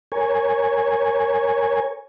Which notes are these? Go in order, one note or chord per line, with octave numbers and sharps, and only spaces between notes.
A#4 C#5 G#5